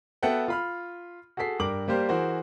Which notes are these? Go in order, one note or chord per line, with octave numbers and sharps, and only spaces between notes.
B3 F#4 A4 E5 F#5 G5
F4 B5 F6
F#4 G#4 A4 B6 C7
G2 A#4 D6 F#7
G3 A#3 G4 C5
E3 F#4 G#4 A#4 C5